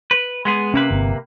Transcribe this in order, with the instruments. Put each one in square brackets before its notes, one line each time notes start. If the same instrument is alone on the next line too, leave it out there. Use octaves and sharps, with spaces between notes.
[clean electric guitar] B4
G#3 B3 G#4
[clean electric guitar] C3 A#3 B4 [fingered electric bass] C#4
[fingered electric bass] G1 C4